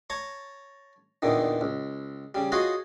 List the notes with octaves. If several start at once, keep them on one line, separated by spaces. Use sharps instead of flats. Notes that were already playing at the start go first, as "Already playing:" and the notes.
C#5 A5 A#5 C#6
E2 A#2 D3 D#3
C#2
C#3 G3
F4 F#4 G#4 C#5 D#5 F#5